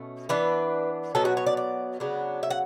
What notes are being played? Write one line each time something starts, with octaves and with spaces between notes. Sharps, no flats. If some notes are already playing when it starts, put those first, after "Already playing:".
Already playing: B2 A3 C#4
E3 B3 D4 B4
B2 F#3 B3 A4
F#4
C#5
D5
D5
C#3 F#3 B3 D4
E5
F#5